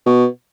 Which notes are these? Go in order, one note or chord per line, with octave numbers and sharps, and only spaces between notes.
B2